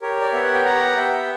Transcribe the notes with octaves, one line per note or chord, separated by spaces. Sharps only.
G4 A#4 C#5
D5
B3 E5
F#5
G5
G4 F#5 A#5
B3 E5 G5